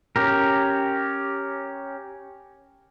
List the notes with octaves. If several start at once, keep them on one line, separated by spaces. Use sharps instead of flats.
C#4 G4 A#4